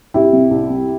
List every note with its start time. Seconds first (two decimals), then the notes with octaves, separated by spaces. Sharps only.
0.14 C2 E4 G4
0.33 C3
0.51 C2
0.70 C3